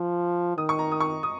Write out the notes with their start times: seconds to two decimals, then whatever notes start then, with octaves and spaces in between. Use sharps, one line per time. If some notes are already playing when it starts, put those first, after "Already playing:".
Already playing: F3
0.57 D#3 D#6
0.69 C#6
0.79 A#5
0.92 D#6
1.00 C#6
1.23 D#6